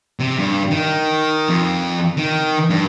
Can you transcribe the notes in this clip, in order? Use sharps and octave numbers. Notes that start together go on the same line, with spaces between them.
C3
G2
D#3
F2
D#3
G2